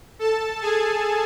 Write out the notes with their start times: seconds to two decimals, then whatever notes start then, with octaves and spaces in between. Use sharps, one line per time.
0.19 A4 A5
0.62 G#4 G#5